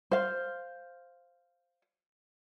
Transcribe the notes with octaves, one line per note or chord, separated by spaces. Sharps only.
C5 F5